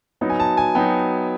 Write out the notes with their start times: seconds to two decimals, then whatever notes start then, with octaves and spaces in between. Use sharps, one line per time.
0.21 F#3 B3 D#4
0.30 G#5
0.40 A5
0.57 G#5
0.75 F#3 B3 D#4 G5